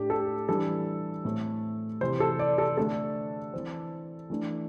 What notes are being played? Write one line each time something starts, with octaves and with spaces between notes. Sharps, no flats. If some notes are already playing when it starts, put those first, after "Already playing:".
Already playing: A2 A3 D4 G4
A4
E3 G3 D4 A4
A2 A3 C4
C3 E3 C4 C5
A4
D5
A4
D3 A3 D4 A4
E3 C4
E3 A3 D4